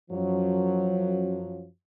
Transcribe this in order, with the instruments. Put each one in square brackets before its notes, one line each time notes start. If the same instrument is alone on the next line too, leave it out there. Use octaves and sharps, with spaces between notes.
[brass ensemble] F#2 F3 F#3